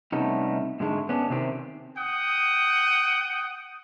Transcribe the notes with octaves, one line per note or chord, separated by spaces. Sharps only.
C3 G3 A3 B3 C#4 D#4
G#2 D3 G#3 A3
B3 C#4 D4
C3 D#3 C4 G4
F#5 G5 D#6